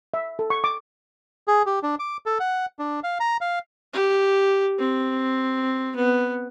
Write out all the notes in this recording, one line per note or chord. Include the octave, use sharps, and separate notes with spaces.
E5
A4
C#6
D6
G#4
G4
D4
D6
A4
F#5
D4
F5
A#5
F5
G4
C4
B3